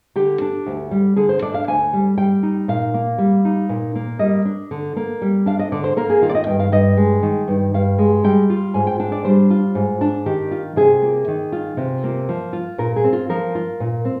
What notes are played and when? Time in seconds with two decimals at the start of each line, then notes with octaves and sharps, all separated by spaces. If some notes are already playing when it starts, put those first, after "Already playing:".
0.16 D3 G4
0.41 D4
0.66 D2
0.91 G3
1.16 D3 G#4
1.29 C5
1.42 D4 D5
1.54 F5
1.68 D2 G#5
1.93 G3
2.18 G3 G5
2.43 D#4
2.68 A#2 F5
2.94 A#3
3.18 G3
3.45 D#4
3.69 A#2
3.95 A#3
4.19 G3 D#5
4.45 D4
4.71 D3
4.96 A#3
5.22 G3
5.46 D4 F5
5.59 D#5
5.72 D3 D5
5.84 C5
5.97 A#3 A#4
6.10 G#4
6.22 D#3 F4
6.29 D5
6.35 D#5
6.47 G2 G5
6.59 F5
6.72 G2 D#5
6.97 G#3
7.22 D#3
7.48 G2
7.74 G2 F5
7.98 G#3
8.24 G3 G5
8.50 F4
8.74 G#2 G#5
8.87 G5
9.00 D4 G5
9.12 D5
9.25 G3 C5
9.50 F4
9.75 G#2
10.01 D4
10.26 D#3 G4
10.51 F4
10.76 C3 G#4
11.02 A#3
11.28 D#3
11.52 F4
11.77 C3
12.04 A#3
12.29 F3
12.53 F4
12.78 A#2 A#4
12.96 G#4
13.04 C4
13.13 F4
13.29 F3 A#4
13.55 F4
13.80 A#2
14.05 C4